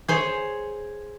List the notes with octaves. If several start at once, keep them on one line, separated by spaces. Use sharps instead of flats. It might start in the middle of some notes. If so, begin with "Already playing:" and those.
G#4 C5 C#5